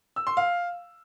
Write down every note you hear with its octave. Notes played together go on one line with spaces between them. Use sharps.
E6
C6
F5